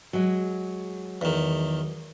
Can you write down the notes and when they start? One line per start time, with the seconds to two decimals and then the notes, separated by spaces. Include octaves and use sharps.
0.13 F#3 G#3
1.21 E2 D#3